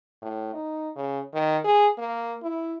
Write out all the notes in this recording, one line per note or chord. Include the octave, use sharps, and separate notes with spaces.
A2
D#4
C#3
D#3
G#4
A#3
E4